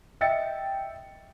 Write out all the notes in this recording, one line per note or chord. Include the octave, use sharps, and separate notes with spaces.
D#5 E5 G5 A6 C#7